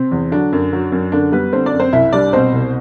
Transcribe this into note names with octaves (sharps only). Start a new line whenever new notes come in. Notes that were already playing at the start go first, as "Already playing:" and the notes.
Already playing: C3 C4
E2
D3 F#3 D4
F#2
F#3
F#2
F#2 D3 D4
G3 B3 B4
D3 C4 C5
D4 D5
F#2
C4 C5
C2 E4 E5
G3 D4 D5
B2 C4 C5
C2